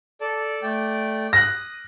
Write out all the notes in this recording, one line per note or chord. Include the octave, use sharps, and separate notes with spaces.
A4 D5 A5
A3 D5 G5
D#6 F#6 A#6